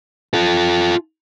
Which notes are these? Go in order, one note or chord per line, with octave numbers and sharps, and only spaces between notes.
F4 A4